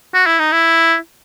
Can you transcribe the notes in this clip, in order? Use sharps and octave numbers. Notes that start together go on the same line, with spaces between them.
F#4
E4
D#4
E4